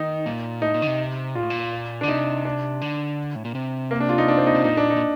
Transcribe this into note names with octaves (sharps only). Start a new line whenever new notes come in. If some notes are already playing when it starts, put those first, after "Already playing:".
Already playing: D#3 D#4
A#2
A2 D#4
A#2
D3
C3
A#2 F4
A2
A#2
D3 D4
C3 D#4
D4
D3
A2
A#2
C3
A#3
D4
F4
D#4
D4
C4
D#4
C3
A#2 D#4
D4
D#4
A#2